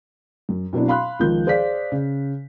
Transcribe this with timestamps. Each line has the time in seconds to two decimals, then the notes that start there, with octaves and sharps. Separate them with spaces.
0.49 F#2
0.73 B2 F#3 C4 D4 E4
0.88 F5 B5 C6 F#6
1.19 C#2 D#3 F3 G6
1.46 G#4 C5 D5 F5 B6
1.92 C#3